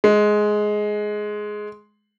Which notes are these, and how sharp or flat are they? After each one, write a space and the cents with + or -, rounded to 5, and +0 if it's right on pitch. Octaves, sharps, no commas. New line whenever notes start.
G#3 +10